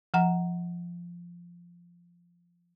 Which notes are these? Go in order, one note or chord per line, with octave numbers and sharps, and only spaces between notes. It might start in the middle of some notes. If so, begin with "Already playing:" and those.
F3 F#5 A#5